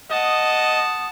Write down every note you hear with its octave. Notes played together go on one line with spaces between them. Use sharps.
D#5 F#5 A5 D#6